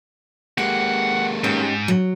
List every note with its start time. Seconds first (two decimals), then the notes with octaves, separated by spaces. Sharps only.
0.58 G#3 A#3 G4 F#5
1.44 G#2 C#4 D#4 G4
1.88 F#3